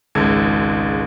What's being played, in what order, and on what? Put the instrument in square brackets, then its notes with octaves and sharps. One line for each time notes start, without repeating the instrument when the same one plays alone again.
[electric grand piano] G#1 C#2 G#3 A4 G#6